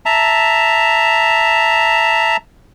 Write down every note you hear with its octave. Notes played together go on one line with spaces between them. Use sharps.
E5 A5 A#5